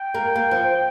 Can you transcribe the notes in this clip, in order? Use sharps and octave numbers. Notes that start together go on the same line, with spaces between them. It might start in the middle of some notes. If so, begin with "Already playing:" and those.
Already playing: G5
A#3
A#3
F3